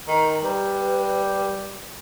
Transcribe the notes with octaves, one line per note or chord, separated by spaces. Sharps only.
D#3 A#5
G3 B4